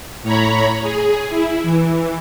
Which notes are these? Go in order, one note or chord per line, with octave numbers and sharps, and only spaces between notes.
A2 C#5 A#5 B5
G#4
E4
E3